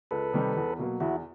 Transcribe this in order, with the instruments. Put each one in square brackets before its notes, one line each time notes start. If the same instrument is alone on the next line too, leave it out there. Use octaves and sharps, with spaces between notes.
[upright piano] C#2 [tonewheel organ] A4 B4
[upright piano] C3 D#3 G3
E2
B2 F#3 A#3
[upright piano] E2 [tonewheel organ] E4 F#4